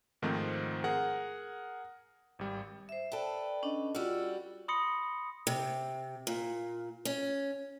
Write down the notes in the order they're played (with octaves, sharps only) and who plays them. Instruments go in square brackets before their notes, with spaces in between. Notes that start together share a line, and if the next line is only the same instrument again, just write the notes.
[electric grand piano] G#2 D#3 F3 A3 C4
G#4 A#4 F#5
G#1 G3
[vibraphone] C5 E5
[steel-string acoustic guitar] A4 B4 [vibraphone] D5 G5
[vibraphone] C#4 D4 D#5
[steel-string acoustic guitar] G3 F#4 [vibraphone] F4 E6
[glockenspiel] B5 C6 D#6 A#6 C#7
[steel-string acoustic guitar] C3
A#2
C#4